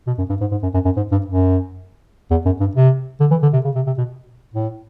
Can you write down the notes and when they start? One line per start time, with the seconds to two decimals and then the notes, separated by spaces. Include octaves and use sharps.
0.07 B2
0.18 F#2
0.29 G2
0.41 G#2
0.51 G#2
0.63 F#2
0.74 F#2
0.85 F#2
0.96 G#2
1.12 G2
1.26 F#2
2.31 E2
2.45 F#2
2.60 G2
2.75 C3
3.20 D3
3.31 E3
3.42 D3
3.53 C3
3.65 C#3
3.76 C3
3.87 C3
3.98 B2
4.54 A2